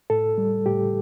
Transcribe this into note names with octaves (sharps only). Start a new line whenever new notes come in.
A2 A4
G3
A2 G4